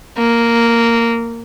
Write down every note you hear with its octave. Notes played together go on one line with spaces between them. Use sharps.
A#3